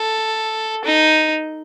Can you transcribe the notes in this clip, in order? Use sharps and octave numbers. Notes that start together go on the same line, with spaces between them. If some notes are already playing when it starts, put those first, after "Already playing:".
Already playing: A4
D#4